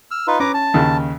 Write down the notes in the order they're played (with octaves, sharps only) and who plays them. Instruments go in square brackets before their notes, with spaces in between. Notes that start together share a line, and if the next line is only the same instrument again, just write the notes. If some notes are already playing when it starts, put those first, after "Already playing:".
[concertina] E6 F6
D#4 F4 B4
[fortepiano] C#4 [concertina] B4 A#5 D6
[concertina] A5
[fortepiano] D#2 C#3